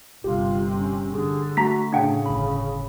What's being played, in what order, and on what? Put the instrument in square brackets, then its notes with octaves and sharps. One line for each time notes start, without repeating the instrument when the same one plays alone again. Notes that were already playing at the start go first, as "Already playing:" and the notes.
[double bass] G1 C3 [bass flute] F4 [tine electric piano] G4
[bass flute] C#4
[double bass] D3 [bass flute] G#4
[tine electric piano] A3 [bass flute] F#4 [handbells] A#5 B6
[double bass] A2 [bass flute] C#3 [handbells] D4 F#5 G5
[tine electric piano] G1 B5